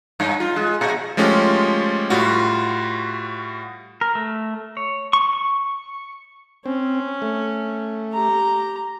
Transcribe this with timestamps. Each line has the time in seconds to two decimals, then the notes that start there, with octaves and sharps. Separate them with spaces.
0.20 G2
0.40 F4
0.56 G#3
0.81 A#2
1.17 F3 G#3 A3 C#4 F4 G4
2.10 A2 G3 F4 F#4
4.01 A#4
4.15 A3
4.77 C#5
5.13 C#6
5.33 C#6
6.66 C4 C#4
7.22 A3
8.13 G4 A#5